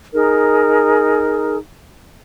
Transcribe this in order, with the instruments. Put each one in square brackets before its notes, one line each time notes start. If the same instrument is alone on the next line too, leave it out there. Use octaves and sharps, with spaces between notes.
[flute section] D#4 G#4 A#4